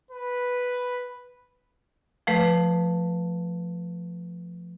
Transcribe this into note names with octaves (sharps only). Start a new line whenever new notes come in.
B4
F3 A3 B4